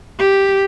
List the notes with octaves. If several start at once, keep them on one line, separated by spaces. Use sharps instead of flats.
G4